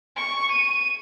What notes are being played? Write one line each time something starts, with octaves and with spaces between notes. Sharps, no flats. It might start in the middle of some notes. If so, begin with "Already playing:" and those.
C#6
D#7